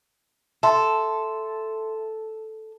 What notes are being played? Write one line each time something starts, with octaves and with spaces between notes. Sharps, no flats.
A4 E5 C6